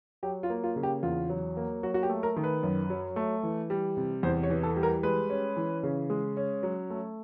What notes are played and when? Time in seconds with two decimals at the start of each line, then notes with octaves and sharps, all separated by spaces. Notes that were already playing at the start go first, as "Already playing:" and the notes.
0.23 F#3 G4
0.43 F4
0.50 A#3
0.64 F4
0.76 C#3
0.83 G4
1.03 E2 F4
1.30 F#3
1.57 A#3
1.83 F#3 F#4
1.94 F#4
2.03 G4
2.10 A3
2.23 A#4
2.36 D#3
2.44 B4
2.63 F#2
2.90 F#3
3.16 A3
3.43 E3
3.70 G3
3.97 C3
4.23 E2 C5
4.43 C#5
4.50 E3
4.63 A4
4.76 G3
4.83 A#4
5.03 G#3 B4
5.30 C#4
5.56 E3
5.83 C#3
6.10 G#3
6.37 C#4
6.63 F#3
6.90 A3